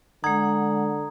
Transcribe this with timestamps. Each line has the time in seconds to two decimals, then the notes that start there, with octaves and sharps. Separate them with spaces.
0.24 D3 G#3 F#5 A#5 D#6 G#6